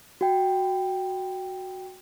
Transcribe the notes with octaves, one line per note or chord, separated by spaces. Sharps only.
F#4 G5